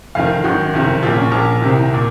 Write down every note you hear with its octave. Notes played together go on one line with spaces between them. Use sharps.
F1 F2 D#3 F5
G#1 F#2 D#3 F#4
F#1 F2 C3 D#3
A#1 A#2 F4
C#4
A#1 A#2
C2 C3 D#3
A#2